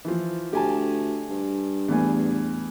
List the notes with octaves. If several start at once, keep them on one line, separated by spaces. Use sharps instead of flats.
E3 F3
D2 G4 G#5 A5
G2
E2 A2 G#5